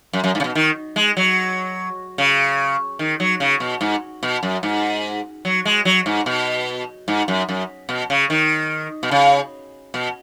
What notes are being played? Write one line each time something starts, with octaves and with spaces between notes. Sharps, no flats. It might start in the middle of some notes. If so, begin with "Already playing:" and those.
F#2
F#2
G#2
C#3
B2
D#3
G#3
F#3
C#3
D#3
F#3
C#3
B2
G#2
B2
F#2
G#2
F#3
G#3
F#3
G#2
B2
G#2
F#2
F#2
B2
C#3
D#3
B2
C#3
B2